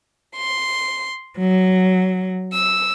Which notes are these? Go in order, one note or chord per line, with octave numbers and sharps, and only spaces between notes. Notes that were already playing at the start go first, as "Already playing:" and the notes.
C6
F#3
E6